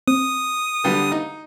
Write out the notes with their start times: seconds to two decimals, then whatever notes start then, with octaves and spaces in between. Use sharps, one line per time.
0.07 C4 D#6
0.84 D3 G3 B3
1.12 D#4